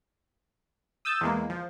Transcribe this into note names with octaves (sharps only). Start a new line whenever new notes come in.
D#6 E6 G6 A6
E2 G#3 A#3
F3